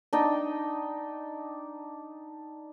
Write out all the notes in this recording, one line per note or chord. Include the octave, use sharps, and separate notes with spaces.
D4 D#4 G5